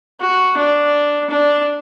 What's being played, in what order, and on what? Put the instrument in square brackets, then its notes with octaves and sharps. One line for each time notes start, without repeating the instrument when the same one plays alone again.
[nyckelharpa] F#4
D4
D4